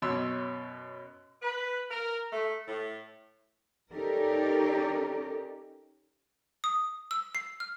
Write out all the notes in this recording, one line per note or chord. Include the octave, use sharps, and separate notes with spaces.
F#2 B2 C#5 C6 E6
B4
A#4
A3
A2
C#4 D#4 G4 A4 A#4 D5
D#6
E6
C7
F6